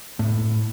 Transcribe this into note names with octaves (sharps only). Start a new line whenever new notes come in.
A2